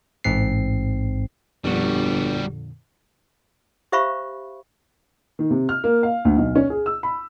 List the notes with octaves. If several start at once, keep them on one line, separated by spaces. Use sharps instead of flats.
A1 G#2 C4 C7
G1 F2 A#2 D3 G3 F#4
G4 C5 E5 F5 B5 C#6
D#3
C3
F6
A#3
F5
D2
B1
C#4
G#4
E6
B5